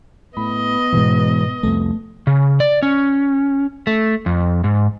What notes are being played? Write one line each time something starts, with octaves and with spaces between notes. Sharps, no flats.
A2 B3 D#5 B5
G#2 B2 E3 G3 G#3
C2 F2 A3
C#3
D5
C#4
A3
F2
G#2